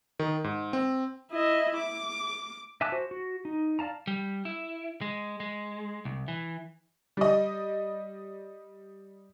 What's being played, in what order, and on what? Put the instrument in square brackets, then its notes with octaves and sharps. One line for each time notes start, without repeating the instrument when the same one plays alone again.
[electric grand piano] D#3
G#2
C4
[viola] E4 D#5
D6
[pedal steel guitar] E5 G#5 A5 D6 F#6
F#4 C5
F#4
D#4
D5 F5 A5 A#5
[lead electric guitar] G3
E4
G#3
G#3
C2
E3
[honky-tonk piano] G3 D#5